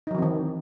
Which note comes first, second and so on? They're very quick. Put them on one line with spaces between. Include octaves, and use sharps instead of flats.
D#4 F#3 E3 C4 D#3